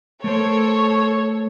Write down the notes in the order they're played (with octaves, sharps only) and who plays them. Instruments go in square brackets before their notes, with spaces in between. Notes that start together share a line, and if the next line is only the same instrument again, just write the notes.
[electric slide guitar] A3 A#4 C5 [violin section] A4 C#5